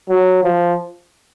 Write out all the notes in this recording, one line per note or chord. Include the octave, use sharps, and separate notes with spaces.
F#3
F3